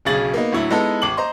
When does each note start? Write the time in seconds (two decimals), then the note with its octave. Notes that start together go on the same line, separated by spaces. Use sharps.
0.05 D1 B1 C#3 G#4 A6 F#7
0.34 A#3 B3 D#4
0.52 D2 A2 F#3 E4
0.71 G#3 B3 D#4 E4 A4
1.02 A1 D6 F#7
1.17 C5 D#5 A#5 C6